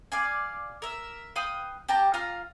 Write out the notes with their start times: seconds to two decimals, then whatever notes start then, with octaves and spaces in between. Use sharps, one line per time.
0.12 D5 F5 G#5
0.82 A#4 E5
1.36 B4 F5 G5 D#6
1.89 G4 G5 A5 A#5
2.14 F4 F5 A#5